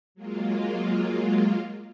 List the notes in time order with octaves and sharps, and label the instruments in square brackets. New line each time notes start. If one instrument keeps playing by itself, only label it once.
[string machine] F#3 G#3 A#3 F4